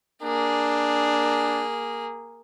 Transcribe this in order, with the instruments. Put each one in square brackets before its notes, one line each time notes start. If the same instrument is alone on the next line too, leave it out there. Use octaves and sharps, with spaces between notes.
[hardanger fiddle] A#3 G#4 [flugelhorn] D4